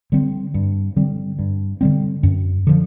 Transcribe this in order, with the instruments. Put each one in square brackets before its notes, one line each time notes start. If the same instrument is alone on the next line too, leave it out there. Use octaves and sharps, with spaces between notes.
[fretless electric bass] D3 G3 C4
G2
D3 G3 C4
G2
D3 G3 C4
F#2
D3 F3